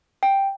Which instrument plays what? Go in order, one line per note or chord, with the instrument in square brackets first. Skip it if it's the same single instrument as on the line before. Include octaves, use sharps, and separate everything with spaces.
[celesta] G5